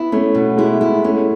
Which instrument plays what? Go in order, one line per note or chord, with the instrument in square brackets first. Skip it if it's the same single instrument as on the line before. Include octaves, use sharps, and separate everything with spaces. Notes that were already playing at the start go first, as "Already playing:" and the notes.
Already playing: [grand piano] B3 [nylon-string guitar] E4
[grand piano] A3 [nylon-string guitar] C#4
[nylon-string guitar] B2
[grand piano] G#3 [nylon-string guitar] E4
[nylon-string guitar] E4
[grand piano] A3 [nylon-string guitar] C#4